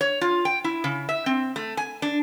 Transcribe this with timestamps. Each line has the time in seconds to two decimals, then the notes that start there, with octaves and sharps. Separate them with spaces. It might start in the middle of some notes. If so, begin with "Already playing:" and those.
0.01 C#5
0.21 F4
0.45 G5
0.64 E4
0.84 C#3
1.09 E5
1.26 C4
1.56 A3
1.77 G#5
2.02 D4